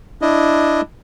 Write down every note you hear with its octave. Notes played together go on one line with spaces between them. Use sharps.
D4 E4 D#5